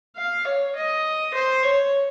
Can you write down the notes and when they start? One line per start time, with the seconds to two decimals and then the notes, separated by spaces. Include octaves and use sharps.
0.16 F5
0.45 C#5
0.75 D#5
1.34 C5
1.64 C#5